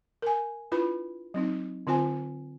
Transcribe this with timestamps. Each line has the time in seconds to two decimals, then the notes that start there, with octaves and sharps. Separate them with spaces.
0.22 A#4 G#5
0.72 D4 E4 F4 B4 B5
1.34 F#3 C4 D#4
1.87 D3 C4 F4 C5 G#5